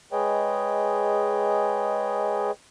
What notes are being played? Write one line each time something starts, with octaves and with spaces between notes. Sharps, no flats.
G#3 G#4 B4 C#5 D#5 G5